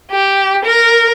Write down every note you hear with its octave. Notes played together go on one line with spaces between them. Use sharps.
G4
A#4